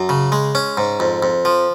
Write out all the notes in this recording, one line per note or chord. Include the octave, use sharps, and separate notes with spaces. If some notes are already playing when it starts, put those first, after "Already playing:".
Already playing: F#2
C#3
G#3
C#4
G#2
F2
F2
F3